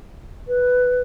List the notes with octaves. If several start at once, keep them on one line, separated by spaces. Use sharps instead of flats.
B4